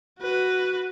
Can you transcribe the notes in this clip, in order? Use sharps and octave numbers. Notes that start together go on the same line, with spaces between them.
F#4 B4